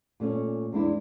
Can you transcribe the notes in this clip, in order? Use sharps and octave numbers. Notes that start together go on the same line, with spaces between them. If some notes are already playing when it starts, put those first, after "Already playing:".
A#2 A3 C#4
E2 G#3 C4 D4 E4